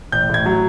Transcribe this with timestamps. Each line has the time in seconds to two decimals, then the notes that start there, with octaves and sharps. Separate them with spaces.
0.12 A1 G6
0.30 A2 G#6
0.46 F#3